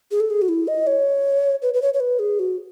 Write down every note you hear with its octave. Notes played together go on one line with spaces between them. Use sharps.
G#4
A4
G#4
F#4
E4
D#5
C#5
B4
B4
C#5
C#5
B4
G#4
F#4